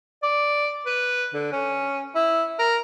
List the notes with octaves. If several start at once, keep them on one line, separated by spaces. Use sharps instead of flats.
D5
B4
D3
C#4
E4
A#4